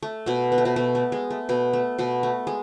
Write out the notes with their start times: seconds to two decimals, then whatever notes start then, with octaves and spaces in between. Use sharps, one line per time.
0.03 A3
0.26 B2 B3
0.52 B3
0.58 A3
0.65 B2 B3
0.76 B2 B3
0.95 A3
1.12 G#3
1.30 A3
1.49 B2 B3
1.73 A3
1.99 B2 B3
2.23 A3
2.47 G#3